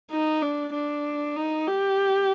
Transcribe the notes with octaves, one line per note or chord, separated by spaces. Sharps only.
D#4
D4
D4
D#4
G4